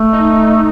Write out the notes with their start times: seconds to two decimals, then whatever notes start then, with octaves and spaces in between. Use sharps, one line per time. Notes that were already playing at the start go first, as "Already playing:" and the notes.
Already playing: A3
0.13 D#4